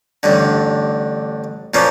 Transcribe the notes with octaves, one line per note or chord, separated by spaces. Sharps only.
A1 G2 D3
A#2 F3 A#3 C#4